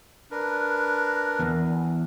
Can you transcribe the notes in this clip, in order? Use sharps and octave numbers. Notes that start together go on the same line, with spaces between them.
D4 A#4 B4
E2